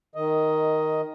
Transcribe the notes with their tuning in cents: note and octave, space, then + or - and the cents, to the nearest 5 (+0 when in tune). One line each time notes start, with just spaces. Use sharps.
D#3 +0 D#5 +10